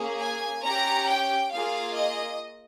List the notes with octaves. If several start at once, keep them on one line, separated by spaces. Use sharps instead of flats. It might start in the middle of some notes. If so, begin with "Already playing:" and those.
Already playing: A#3 C#4 G#4
G#5
C#4 G4 A#5
G5
A#3 F4 G#4 F5
D#5